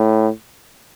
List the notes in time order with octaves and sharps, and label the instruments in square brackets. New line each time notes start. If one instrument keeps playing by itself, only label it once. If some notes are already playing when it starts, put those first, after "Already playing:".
Already playing: [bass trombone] A2